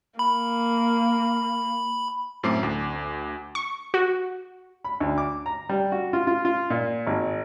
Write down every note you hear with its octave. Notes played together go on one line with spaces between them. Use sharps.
A#3 B5
F#2 A2 A3 C4 D6 C7
D2
C#6
F#4
B5
D2
D6
A#5
G3
F#4
F4
F4
F4
A#2
G#1